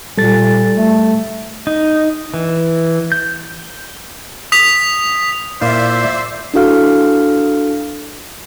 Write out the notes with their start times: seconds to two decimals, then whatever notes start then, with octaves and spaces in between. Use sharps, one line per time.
0.18 A#2 G3 A4 A6
0.76 A3
1.67 D#4
2.34 E3
3.12 G6
4.52 D#6 B6 F7
5.61 A#2 E4 F4 C5 D5 E5
6.54 D4 E4 F#4 A4 F5 F6